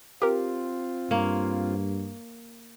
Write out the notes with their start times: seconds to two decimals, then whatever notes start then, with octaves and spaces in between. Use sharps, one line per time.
0.22 C4 F4 G4 A#4
1.11 G2 A#3 C#5